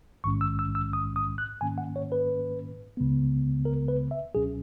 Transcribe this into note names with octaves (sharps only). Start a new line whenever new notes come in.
A#1 G#2 D#3 G#3 C#4 C#6
E6
E6
E6
D#6
D#6
F#6
G#2 D#3 A#3 C#4 G#5
F#5
C#5
B4
C#2 C#3 G#3 B3
A#4
B4
E5
C#2 B2 F#3 C#4 G#4